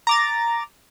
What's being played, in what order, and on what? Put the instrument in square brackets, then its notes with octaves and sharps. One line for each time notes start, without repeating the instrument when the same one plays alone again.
[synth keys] A#5 D6 A6